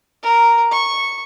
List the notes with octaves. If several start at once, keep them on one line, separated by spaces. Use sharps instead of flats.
A#4
C#6